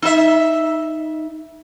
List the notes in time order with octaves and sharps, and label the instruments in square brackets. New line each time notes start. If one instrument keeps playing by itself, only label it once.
[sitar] D#4 E5